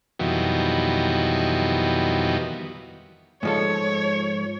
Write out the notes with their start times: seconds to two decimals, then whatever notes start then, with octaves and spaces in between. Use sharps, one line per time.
0.19 F2 B2 D#3 E3 F#3 G3
3.43 G#2 F3 A4 C#5